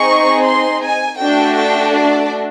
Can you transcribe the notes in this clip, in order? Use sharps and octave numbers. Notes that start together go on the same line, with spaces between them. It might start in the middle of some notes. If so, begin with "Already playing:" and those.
Already playing: C4 D#4 G#4 C#6
C6
G#5
A3 D4 F#4 A4 G5
G5
D5